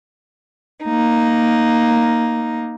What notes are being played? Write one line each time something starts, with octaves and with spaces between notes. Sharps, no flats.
A#3 D#4